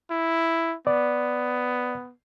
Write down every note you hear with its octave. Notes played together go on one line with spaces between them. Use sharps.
E4
B3 D5